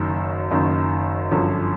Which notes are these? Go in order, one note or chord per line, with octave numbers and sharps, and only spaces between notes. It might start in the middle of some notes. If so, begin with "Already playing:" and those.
Already playing: F#1 F#2 D#3
F#1 F#2 D#3
G1 F#2 D3 F3